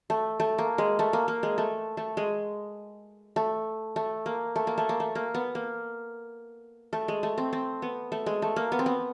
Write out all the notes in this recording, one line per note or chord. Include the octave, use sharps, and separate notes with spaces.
A3
A3
A#3
G#3
A3
A#3
A#3
G#3
A3
A3
G#3
A3
A3
A#3
A3
A#3
A3
A#3
A3
A#3
B3
A#3
A3
G#3
A3
C4
C4
B3
A3
G#3
A3
A#3
B3
C4
B3